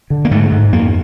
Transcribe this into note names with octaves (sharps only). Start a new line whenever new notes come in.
D3
A#3
G#2 A3
G#2
F2 A#3